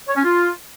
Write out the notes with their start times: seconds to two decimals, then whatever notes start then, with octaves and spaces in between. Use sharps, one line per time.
0.08 C#5
0.16 C#4
0.24 F4